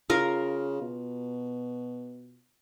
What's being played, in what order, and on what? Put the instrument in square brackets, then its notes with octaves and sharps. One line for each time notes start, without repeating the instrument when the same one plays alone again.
[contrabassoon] C#3 [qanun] F4 A#4 F5
[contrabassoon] B2